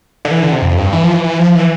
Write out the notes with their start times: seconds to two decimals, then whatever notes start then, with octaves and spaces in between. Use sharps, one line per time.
0.25 D3
0.31 E3
0.42 D3
0.52 C3
0.62 F2
0.77 G2
0.93 E3
1.04 F3
1.14 E3
1.24 E3
1.39 F3
1.55 E3